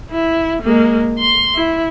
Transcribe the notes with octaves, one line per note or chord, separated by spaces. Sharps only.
E4
G#3 A#3
C6
E4